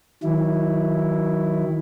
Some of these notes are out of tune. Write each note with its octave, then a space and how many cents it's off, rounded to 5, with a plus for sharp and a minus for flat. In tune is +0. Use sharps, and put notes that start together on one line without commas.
D#3 +25 F#3 +0 E4 +0